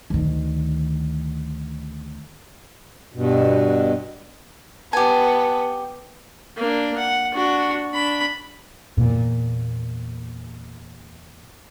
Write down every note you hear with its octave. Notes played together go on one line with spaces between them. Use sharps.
D2 D#3
G2 B2
B3 G4 G#5 A5
A#3 D4
F#5
D4 F#4
D4 B5
E2 A#2